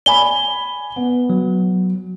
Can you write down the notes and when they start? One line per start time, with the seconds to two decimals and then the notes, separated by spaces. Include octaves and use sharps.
0.06 D5 G#5 B5 G7
0.96 B3
1.30 F#3